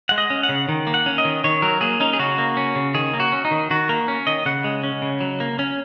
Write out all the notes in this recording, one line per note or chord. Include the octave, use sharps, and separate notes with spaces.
G#3 F#5
D#5
C#4
F#5
C#3
D#3
A#3
F#5
C#4
D#5
D#3
D#3 C#5
F#3 A#4
A#3 G#4
C#4 D#4
G#4
C#3 F#4
A#3
C#4
C#3
D#3 G#4
A#3
F#4
C#4
D#4
D#3
D#3 F#4
A#3 A#4
C#4
D#3 D#5
C#3 F#5
G#3
C#4
C#3
F#3
A#3
C#4